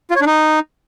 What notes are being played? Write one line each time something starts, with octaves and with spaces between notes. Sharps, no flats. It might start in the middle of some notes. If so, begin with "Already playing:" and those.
F4
C#5
D4
D#4